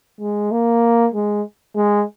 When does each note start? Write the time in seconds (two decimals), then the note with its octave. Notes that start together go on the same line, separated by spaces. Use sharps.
0.20 G#3
0.51 A#3
1.14 G#3
1.76 G#3